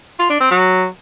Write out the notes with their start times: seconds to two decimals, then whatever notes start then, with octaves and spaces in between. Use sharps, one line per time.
0.19 F4
0.30 D4
0.40 C4
0.51 F#3